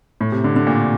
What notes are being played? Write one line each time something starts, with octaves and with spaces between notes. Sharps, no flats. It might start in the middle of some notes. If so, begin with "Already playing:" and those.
A2
C3
D3
D3
A#2